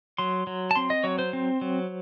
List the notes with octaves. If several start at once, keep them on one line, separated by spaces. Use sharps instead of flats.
F#3 C6
F#3
A5
C4 C6
D#5
F#3 C#5
C5
C4
F#3